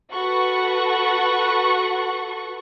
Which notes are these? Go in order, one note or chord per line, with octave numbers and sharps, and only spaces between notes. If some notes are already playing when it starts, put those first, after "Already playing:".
F#4 A4 B4 F#5 C#6